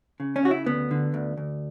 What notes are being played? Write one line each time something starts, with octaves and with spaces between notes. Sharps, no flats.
C#3
C#4
C#3 F#4
E4
D2 B3
D3
D2
D2